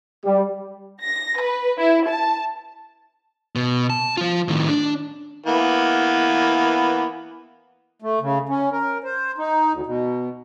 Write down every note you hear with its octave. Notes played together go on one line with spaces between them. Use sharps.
G3
A#6
B4
E4
A5
B2
A5
F3 F4
A2 D#3
D4
E3 A#3 B3
A3
C#3
C#4
A#4
C5
D#4
D2
B2